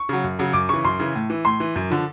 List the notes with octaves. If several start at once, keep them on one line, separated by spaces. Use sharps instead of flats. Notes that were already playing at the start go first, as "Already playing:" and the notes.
Already playing: C#6
C#3 F#3
F#2
C#3 F#3
F#2 D6
C#3 E3 C#6
F#2 C6
C#3 E3
A2
E3
A2 C6
E3
F#2
D3 F3